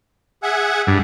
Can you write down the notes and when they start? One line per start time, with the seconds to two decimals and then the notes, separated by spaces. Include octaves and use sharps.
0.43 G#4 E5 F#5
0.87 G2